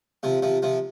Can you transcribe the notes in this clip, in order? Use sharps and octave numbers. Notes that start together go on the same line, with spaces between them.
C3 F3
C3 F3
C3 F3